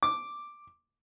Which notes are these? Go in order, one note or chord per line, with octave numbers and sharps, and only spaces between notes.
D6